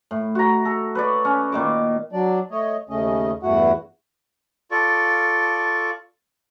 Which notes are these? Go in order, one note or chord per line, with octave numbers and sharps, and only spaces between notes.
A2
F#4 A#5
A4
B4 C#5 D5
C#4
A#2 D#3 D6
F#3 D4 D5
A3 C#5 D#5
D#2 C#3 A3 C#4 D#5
E2 G2 A3 E4 F#4 F#5
F4 A4 D5 C#6